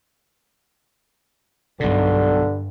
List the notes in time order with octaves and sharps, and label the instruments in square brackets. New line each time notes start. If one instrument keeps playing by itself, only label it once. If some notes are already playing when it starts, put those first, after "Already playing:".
[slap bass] B1 B2 [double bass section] G2 G3 [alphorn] D3